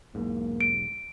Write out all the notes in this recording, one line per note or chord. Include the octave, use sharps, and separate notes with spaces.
E1 B1 G#2 A#3
D7